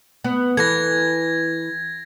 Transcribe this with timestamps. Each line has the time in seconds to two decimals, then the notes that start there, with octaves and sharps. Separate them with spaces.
0.24 B3
0.57 E3 A4 G#6 A#6